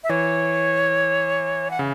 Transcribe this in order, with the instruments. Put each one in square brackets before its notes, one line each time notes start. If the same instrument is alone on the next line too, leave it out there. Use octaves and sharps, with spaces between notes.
[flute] E5
[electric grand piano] E3 [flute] C#5
[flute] F#5
[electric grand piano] C#3